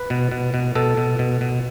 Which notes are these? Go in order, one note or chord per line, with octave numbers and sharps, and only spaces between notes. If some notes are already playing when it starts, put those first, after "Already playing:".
Already playing: B4
B2
B2
B2
B2 A4
B2
B2
B2